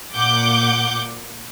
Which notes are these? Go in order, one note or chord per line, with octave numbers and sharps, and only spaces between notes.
A#2 F#5 D6 G6